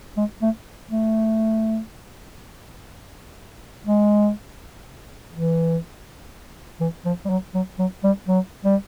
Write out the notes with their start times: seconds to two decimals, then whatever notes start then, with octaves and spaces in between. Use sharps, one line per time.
0.17 G#3
0.42 A3
0.91 A3
3.86 G#3
5.33 E3
6.80 E3
7.05 F3
7.25 G3
7.30 F#3
7.54 F#3
7.79 F#3
8.04 G3
8.28 F#3
8.65 G3